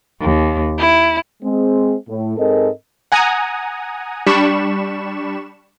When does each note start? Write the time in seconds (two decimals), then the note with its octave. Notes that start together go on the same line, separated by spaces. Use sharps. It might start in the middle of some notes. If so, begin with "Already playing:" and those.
0.20 D#2
0.79 E4
1.42 G#3 C4
2.08 A2
2.37 G#2 G#3 C4 A4 A#4 D#5
3.12 F#5 G#5 A#5 D#6
4.26 G3 D4 B5 C#6 E7